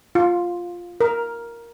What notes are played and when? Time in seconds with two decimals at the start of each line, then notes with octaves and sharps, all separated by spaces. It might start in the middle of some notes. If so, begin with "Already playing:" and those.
0.15 F4
1.01 A#4